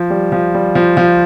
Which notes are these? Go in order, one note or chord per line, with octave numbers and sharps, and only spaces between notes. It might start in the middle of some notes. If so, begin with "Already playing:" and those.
Already playing: F3
G3
F3
G3
F3
F3